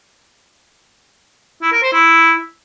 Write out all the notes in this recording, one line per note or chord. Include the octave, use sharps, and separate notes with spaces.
E4
A#4
C5
E4